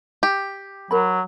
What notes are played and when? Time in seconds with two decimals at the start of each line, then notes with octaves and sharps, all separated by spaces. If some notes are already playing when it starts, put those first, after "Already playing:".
0.23 G4
0.91 F#3 A#4 B5